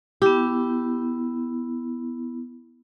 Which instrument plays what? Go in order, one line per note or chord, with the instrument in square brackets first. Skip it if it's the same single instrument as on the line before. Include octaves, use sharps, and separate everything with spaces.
[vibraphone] B3 E4 [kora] G4